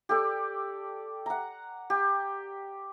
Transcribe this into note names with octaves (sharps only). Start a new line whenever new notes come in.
G4 A4 D5
F#5 A#5
G4